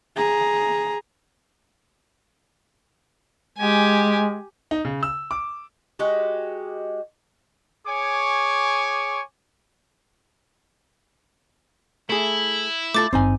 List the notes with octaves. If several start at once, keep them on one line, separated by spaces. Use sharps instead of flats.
G#4 A#5
G#3 G4 G#5
D#4
C#3
E6
D6
G#3 F#4 G4
G#4 C#5 G#5 C#6 D6
A3 E4 G#4
A3 F4 A4 D6 A6
G#1 G2 C4 D#4 G#5